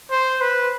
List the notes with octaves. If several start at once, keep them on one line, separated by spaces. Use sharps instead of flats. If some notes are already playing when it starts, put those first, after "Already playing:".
C5
B4